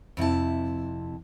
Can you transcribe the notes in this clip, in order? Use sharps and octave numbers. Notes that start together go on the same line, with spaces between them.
F2 C3 E4 A5